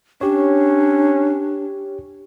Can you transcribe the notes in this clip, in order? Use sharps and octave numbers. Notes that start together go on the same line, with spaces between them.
C#4 D4 G4 C#5